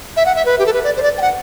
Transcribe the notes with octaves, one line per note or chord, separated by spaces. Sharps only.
E5
F#5
E5
B4
G4
A4
B4
D5
C5
D5
G5
F#5